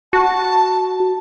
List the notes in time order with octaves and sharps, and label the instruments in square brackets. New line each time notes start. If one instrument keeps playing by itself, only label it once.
[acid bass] F#4 [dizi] A5